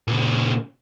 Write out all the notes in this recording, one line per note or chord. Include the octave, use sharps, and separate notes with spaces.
A#2 C#3